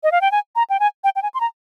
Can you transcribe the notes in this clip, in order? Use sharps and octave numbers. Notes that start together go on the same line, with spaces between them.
D#5
F5
G5
G#5
A#5
G5
G#5
G5
G5
G#5
C6
A#5